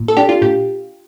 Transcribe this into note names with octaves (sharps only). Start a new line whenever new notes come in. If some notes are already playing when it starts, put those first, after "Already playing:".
Already playing: A#2
A4
D4 G4
F4
A#2 G4